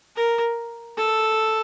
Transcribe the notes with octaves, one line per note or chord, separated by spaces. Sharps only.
A#4
A4